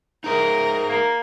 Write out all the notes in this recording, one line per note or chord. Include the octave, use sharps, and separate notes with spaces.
D#4 G#4 A#4 E5
A#3